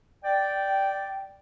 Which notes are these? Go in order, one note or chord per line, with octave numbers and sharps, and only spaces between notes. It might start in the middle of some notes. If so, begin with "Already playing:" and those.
D5 G5